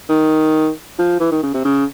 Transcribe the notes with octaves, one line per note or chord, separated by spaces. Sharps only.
D#3
F3
E3
D#3
C#3
C3
C#3